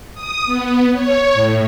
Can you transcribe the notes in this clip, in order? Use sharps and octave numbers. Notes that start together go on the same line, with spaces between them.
D#6
B3
C#5
A2